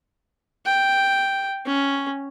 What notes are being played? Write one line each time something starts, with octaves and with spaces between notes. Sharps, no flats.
G5
C#4